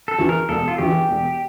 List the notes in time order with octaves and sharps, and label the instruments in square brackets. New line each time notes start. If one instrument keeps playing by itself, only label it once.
[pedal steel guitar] A4
[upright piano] E2 E3
[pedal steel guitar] A#4
[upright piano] E1 [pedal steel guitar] A4
[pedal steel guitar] F4
[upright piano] E2 E3 [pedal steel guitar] G4
[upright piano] E1